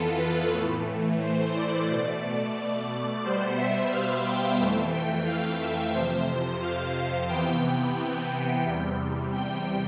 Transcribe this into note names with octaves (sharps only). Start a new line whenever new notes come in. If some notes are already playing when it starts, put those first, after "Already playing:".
Already playing: F2 E3 B3 F4 A4
B4
A2 E3 A3
C5
D5
B2 A3
B2 G3 B3 C5
E5
F5
G5
F2 E3 A3
G5
F5
E5
F2 C3 F3 C5
C5
F5
C3 E3 B3 G5
E2 C3 G3
G5